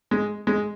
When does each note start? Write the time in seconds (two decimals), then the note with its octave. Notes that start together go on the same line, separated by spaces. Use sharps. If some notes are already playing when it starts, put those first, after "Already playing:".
0.11 G#3
0.47 G#3